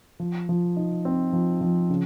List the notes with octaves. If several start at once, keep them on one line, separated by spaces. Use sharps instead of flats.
F3
F3
D#4
C4
F3
F3
C#3